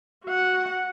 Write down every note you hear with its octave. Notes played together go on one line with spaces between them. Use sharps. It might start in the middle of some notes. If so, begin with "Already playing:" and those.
F#4 F#5